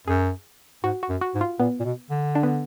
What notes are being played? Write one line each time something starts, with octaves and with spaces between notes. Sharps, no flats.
F#2 G#4
G#2 F#4
F#4
F#2
F#4
G#2
F4
A#2 B3
A#2
B2
D3
D4
B3